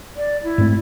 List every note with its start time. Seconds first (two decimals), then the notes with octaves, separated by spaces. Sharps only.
0.16 D5
0.44 E4
0.58 G#2 A3 C4